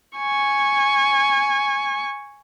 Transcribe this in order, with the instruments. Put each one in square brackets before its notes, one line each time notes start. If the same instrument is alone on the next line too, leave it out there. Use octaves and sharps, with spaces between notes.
[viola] G#5 C#6